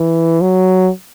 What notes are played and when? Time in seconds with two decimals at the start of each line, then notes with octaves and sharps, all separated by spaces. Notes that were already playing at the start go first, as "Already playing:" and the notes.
Already playing: E3
0.41 F#3